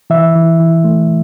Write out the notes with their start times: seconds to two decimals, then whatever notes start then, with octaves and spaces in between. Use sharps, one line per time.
0.10 E3 E5
0.35 E3
0.60 E3
0.84 A3